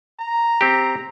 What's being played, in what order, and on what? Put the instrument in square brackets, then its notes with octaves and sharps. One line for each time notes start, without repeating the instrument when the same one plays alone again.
[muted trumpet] A#5
[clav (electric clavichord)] C4 G4